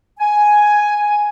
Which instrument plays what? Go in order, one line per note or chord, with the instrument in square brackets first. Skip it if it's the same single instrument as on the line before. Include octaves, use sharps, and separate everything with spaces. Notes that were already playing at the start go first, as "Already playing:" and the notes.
[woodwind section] G#5